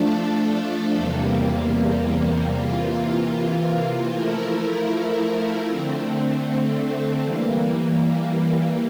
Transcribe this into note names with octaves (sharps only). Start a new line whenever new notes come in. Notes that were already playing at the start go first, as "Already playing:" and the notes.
Already playing: F3 A3 D4 A4
E2 C3 G3 A#3
C3 E3 A#3 F4
F3 A3 E4 A#4
D3 A3 C4
E3 G3 A#3